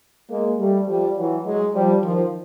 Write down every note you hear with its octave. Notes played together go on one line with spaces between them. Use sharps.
G#3 A#3
G3 A3
F3 G3
E3 F#3
F#3 G#3
F3 G3
D#3 F3